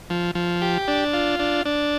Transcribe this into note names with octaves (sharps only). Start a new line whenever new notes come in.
F3
F3
G4
D4
F4
D4
D4